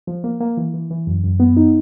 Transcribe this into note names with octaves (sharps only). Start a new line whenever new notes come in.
F3
A#3
A#3
E3
E3
E3
F#2
F#2
B3
D#4